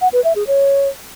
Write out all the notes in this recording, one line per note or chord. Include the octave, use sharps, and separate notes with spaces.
F#5
B4
E5
G#4
C#5